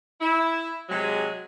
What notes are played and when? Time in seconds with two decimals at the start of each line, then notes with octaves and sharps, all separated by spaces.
0.20 E4
0.89 C3 F#3 G#3